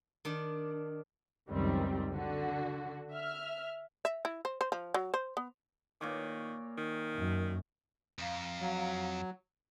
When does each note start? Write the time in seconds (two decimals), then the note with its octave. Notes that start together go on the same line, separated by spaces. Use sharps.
0.25 D#3 D4
1.48 C#2 F#2 D#3 G3 C4
2.12 D3 F#4
3.11 E5 F6
4.05 E5
4.25 E4
4.45 C5
4.61 C5
4.72 F3
4.94 F#3
5.14 C5
5.37 B3
6.01 A#2 D#3 C#5 D6
6.78 D#3
7.16 F#2
8.19 F2 F5 A#5
8.60 F#3